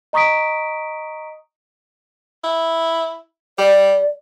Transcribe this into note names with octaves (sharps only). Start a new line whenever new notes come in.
D#5 A#5 C#6 D#6 B6 D7
E4
G3 D5